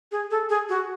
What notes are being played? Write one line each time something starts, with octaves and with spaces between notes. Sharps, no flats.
G#4
A4
G#4
F#4